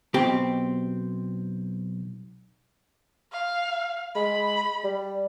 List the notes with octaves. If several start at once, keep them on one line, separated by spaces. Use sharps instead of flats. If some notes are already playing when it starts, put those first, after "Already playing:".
B1 B2 C4 G4
F5
G#3 B5
G3